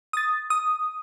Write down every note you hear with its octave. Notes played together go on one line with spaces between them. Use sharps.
D#6 A6
D#6